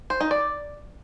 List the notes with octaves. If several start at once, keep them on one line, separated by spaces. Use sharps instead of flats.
C5
D#4
D5